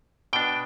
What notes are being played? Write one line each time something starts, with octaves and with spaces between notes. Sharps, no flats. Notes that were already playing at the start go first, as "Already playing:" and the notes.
B2 B3 D4 G5